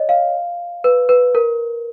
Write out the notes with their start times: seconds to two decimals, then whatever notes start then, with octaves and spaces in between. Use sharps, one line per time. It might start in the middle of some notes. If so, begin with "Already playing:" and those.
Already playing: C#5 D#5
0.09 F5
0.84 B4
1.09 B4
1.35 A#4